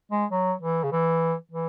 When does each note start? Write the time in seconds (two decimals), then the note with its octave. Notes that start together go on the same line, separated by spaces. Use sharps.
0.11 G#3
0.31 F#3
0.61 E3
0.84 C#3
0.92 E3
1.51 E3